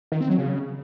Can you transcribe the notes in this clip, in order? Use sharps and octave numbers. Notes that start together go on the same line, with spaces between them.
D#3
C4
F#3
C#3